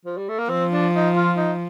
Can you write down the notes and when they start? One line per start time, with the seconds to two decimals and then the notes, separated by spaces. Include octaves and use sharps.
0.06 F3
0.18 G3
0.29 A3
0.39 A#3
0.50 F3 C4
0.72 D4
0.94 D#4
1.16 F4
1.37 D#4